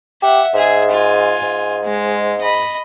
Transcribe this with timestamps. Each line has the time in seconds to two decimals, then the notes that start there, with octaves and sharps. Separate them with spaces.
0.22 G4 E5 F#5
0.54 G#2 G#4 E5
0.91 F4 G#5
1.43 G#2
1.85 G#3
2.42 D#5 B5